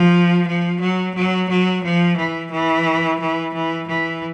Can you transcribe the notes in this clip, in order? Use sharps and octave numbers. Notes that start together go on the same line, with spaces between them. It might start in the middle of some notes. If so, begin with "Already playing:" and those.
Already playing: F3
F3
F#3
F#3
F#3
F3
E3
E3
E3
E3
E3